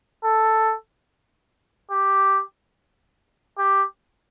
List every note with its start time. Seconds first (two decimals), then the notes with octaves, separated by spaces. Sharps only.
0.24 A4
1.91 G4
3.58 G4